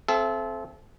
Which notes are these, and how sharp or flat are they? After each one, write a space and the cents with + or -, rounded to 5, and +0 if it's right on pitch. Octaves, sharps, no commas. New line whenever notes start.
C4 +0 A4 -30 E5 +35